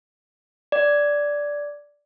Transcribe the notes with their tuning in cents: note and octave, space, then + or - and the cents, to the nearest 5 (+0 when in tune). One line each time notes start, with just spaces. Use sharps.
D5 -5